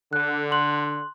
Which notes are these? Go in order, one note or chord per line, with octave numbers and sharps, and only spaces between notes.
D3 F#6
C6 F#6 F#7